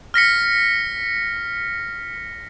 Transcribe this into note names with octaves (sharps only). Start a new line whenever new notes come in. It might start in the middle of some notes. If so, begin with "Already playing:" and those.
F6 A#6 B6 C#7